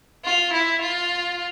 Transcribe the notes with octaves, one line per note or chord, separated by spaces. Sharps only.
F4
E4
F4